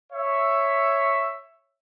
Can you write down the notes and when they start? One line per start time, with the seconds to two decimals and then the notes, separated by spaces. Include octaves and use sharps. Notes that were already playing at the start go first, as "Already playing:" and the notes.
0.12 C#5 E5